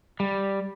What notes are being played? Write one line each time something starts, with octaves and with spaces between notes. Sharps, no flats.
G3